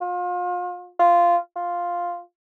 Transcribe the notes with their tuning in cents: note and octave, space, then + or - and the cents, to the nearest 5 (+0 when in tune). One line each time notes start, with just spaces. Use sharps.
F4 +35
F4 -10
F4 +5